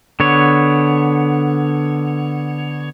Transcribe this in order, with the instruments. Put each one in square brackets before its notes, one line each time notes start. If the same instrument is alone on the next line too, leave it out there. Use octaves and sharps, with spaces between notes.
[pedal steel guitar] D3 B3 C#5